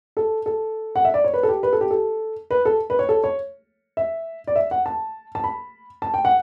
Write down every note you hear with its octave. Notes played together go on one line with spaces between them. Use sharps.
A4
A4
F#5
E5
D5
C#5
B4
A4
G4
B4
A4
G4
A4
B4
A4
B4
C#5
A4
C#5
E5
D5
E5
F#5
A5
A5
B5
A5
G5
F#5